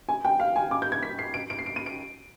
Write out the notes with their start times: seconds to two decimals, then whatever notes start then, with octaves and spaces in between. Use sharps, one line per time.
0.09 G#5
0.25 G5
0.40 F5
0.56 G#5
0.71 D6
0.82 G6
0.92 G#6
1.03 B6
1.19 C7
1.34 D7
1.50 D7
1.59 C7
1.66 D7
1.76 D#7
1.86 D7